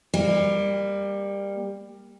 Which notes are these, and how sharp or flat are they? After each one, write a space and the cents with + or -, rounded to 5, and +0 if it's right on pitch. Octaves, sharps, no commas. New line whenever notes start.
G3 +20 A#3 +0